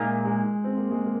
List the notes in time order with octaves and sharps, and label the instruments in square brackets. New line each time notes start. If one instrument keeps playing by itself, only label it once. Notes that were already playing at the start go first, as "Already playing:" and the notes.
Already playing: [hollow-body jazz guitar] A#2 A#3 D#4 [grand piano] G#3
[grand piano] G#3
C4
A#3
G#3
A#3